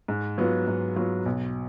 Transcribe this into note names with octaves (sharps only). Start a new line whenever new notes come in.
G#2
F#3 B3 F4
G#2
F#3 B3 F4
B1